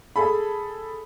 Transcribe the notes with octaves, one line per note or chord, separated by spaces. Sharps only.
G#4 A4 B5